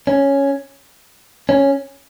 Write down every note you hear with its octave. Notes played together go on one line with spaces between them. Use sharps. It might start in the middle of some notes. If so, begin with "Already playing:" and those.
C#4
C#4